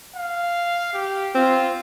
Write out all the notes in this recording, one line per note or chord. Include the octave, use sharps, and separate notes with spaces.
F5
G4
C4 F4